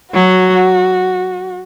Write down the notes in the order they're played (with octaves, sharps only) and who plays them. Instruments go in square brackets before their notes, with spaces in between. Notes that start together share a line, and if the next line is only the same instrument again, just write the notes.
[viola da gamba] F#3 [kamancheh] F#4